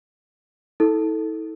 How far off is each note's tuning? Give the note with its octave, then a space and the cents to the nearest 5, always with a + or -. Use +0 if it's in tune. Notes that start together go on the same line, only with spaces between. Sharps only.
E4 -45 A4 +0